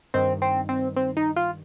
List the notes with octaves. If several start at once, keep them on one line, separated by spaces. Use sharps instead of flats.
G2 D#3 C4
C4
C4
C4
D#4
F4